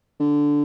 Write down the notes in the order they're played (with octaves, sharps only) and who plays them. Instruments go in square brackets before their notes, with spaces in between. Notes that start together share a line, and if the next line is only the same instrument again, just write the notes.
[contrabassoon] D3